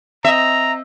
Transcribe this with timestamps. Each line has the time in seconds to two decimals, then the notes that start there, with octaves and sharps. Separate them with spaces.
0.25 C4 D#5 E5 A#5